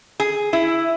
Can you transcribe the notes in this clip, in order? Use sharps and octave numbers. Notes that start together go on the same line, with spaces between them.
G#4
E4